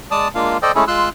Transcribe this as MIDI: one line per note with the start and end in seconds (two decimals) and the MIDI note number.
0.11 0.28 56
0.11 0.28 74
0.11 0.28 81
0.11 0.28 87
0.35 0.58 56
0.35 0.58 58
0.35 0.58 62
0.35 0.58 65
0.35 0.58 77
0.62 0.72 69
0.62 0.72 72
0.62 0.72 74
0.62 0.72 75
0.62 0.72 79
0.75 0.85 56
0.75 0.85 57
0.75 0.85 61
0.75 0.85 64
0.75 0.85 68
0.75 0.85 69
0.88 1.09 56
0.88 1.09 65
0.88 1.09 84
0.88 1.09 88
0.88 1.09 90